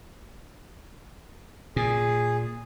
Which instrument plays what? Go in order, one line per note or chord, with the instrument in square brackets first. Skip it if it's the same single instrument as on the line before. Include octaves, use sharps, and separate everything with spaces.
[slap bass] A#2 [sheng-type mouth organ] G#4